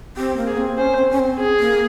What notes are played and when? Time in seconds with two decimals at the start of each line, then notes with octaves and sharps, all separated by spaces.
0.17 C4 G4
0.37 A#3
0.47 G#4
0.58 C4
0.78 C#4 C5
0.98 C4
1.11 C#4
1.19 C4
1.40 G#4
1.60 A#3